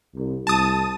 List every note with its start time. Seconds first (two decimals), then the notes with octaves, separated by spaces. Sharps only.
0.15 C2
0.47 C2 A5 D#6